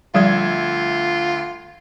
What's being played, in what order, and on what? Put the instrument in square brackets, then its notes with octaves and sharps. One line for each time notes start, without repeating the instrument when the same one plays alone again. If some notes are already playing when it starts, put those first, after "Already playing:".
[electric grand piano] D2 E5 G#6 [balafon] F3 G3 [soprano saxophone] F4